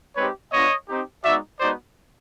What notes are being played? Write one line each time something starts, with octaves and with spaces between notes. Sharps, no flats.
G#3 C4 D#4 G4 B4 C#5
B3 D4 F4 C#5 D#5
C4 D#4 G4
G#3 B3 D#4 F#4 D5 E5
G#3 B3 D#4 F#4 C5 D5